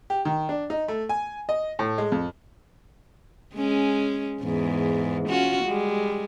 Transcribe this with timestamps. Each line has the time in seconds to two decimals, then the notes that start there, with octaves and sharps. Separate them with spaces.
0.10 G4
0.25 D#3
0.49 D4
0.70 D#4
0.88 A3
1.09 G#5
1.49 D#5
1.79 A2
1.98 G#3
2.12 F2
3.55 G#3 C#4
4.42 E2 G#2
5.29 C#4 F4 F#4
5.64 G3 G#3